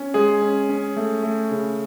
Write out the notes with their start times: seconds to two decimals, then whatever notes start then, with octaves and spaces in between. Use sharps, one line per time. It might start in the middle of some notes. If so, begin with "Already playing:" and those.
Already playing: C#4
0.14 G#3 G#4
0.42 C#4
0.69 C#4
0.96 A3
1.23 A3
1.51 C#3